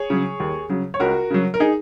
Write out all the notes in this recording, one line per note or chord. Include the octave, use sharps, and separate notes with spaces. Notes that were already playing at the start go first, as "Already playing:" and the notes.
Already playing: G#4 C#5
C#3 F#3
D#2
C#3 F#3
C#5
C#2 F#4 A#4
C#3 F#3
A#4
D#4 G#4